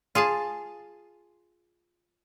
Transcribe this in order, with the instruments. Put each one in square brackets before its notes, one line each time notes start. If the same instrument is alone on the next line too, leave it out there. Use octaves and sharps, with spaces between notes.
[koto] F4 G#4 G#5 A5